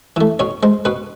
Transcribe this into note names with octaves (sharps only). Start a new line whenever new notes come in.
E3 A3
B2 C#5
G#3 C5
B2 B4